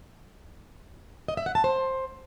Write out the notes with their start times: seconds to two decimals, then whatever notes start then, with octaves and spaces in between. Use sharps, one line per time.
1.28 D#5
1.37 E5
1.46 F#5
1.55 A5
1.64 C5